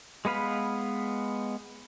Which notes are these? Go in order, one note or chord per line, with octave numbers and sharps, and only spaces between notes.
G#3 B3 B4 F5 B5